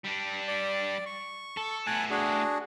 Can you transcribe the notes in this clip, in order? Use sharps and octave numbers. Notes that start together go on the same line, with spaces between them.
G3 D4
D5
C#6
A4
A2 B3 G#5 A5 F#6
D4 F#4 G#4